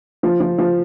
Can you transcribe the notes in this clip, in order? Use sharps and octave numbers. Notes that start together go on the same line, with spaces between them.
F3
F3
F3